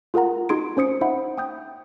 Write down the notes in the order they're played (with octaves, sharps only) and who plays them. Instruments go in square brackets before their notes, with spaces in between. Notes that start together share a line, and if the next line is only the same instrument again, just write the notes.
[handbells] F4 G#4 A#4 F#5 A#5
D#4 F#4 G#4 C6 G#6 D7
C#4 C5 D#6 C#7
D#4 C5 E5 F#5 B5
G5 D#6 G6